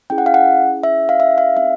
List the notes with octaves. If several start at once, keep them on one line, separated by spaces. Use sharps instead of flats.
C#4 E4 G#4 G5
F#5
F5
F#5
E5
F5
E5
F5
C4 D#4 G#4 E5